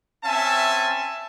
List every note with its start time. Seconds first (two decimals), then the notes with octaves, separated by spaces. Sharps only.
0.24 C4 C#4 E5 G#5 A5